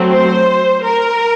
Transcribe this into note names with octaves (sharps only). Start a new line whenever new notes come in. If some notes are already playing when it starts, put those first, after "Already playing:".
Already playing: F#3 A3 C4
C5
A#4